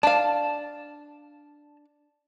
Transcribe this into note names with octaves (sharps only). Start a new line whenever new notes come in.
D4 F5 A5